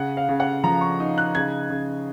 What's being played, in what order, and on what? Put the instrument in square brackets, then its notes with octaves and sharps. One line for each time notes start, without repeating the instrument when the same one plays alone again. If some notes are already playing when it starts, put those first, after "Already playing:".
Already playing: [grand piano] C#3 [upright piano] F#5
[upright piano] F5
[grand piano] C#3
[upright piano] F#5
[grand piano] F3 [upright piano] A#5
[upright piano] C#6
[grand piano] D#4
[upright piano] F#6
[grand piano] C#3 [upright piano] G#6
[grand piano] C#3